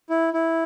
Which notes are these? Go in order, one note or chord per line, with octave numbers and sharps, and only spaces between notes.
E4
E4